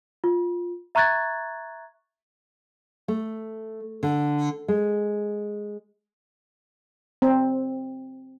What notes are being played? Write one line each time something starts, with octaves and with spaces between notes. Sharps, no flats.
F4
E5 A#5 C#6 F#6 G#6 A6
A3
D3
G#3
C4